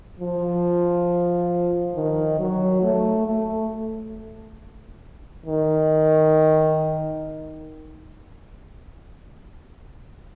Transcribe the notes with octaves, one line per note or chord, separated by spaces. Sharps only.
F3
D#3
F#3
A3
A3
D#3